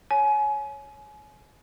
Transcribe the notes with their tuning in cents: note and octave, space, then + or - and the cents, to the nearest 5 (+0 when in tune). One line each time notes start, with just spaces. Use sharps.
C#5 +0 G#5 +30